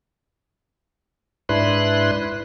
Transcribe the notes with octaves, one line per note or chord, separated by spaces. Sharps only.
G#2 D4 E4 B4 C6 F#6